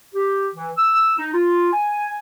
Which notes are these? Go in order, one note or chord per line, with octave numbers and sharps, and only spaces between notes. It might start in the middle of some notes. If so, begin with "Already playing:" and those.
G4
E3
E6
D#4
F4
G#5